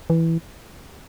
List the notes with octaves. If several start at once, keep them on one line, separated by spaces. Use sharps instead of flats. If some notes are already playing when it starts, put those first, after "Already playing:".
E3